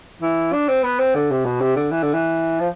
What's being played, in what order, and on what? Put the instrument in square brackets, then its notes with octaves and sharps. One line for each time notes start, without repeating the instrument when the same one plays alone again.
[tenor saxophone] E3
D4
C4
B3
C4
D3
C3
B2
C3
D3
E3
D3
E3
F3